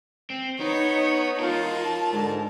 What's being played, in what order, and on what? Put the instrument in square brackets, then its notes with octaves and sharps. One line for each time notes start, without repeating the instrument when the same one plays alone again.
[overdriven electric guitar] C4
[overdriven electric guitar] B3 [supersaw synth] D#4 [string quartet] C#5
[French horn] F4 [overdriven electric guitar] A#4 C#5 [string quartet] A5
[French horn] F4
[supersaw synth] G#2 [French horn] D3